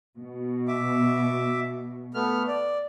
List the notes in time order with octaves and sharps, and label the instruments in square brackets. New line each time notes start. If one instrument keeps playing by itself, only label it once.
[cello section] B2
[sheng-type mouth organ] E5 D6
A3 B3 F6
D5